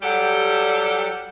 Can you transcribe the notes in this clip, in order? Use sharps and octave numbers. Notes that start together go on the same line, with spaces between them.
F#3 G3 G4 A4 D5 F#5